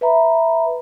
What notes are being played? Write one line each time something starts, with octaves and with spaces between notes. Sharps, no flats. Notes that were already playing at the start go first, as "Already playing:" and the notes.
B4 E5 A#5 B5